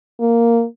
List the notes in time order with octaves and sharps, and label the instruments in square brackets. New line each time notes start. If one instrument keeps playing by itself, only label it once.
[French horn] A#3